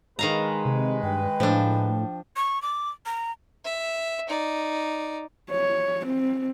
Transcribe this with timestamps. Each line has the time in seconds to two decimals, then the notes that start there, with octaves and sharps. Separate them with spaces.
0.19 D#3 G#3 B4 F5 A#5
0.66 C3
1.03 G2 G5
1.40 A2 F3 D4
2.36 C#6
2.62 D6
3.06 A#5
3.65 E5
4.28 D#4 D5
5.51 C#5
6.06 C4